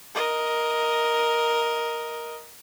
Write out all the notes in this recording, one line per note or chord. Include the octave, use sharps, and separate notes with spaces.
A#4 D#5